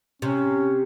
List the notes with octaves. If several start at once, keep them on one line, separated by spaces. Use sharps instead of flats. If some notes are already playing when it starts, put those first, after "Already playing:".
C3 C#4